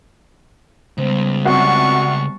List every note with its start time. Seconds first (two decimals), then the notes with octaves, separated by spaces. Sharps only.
0.98 C#2 G3 B3 C5
1.45 C2 F#4 A5 C#6